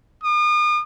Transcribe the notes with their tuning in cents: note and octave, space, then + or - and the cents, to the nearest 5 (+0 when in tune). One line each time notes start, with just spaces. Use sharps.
D#6 -40